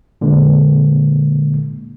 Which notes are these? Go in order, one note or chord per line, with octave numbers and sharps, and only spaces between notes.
A#2 D3 G#3 A#3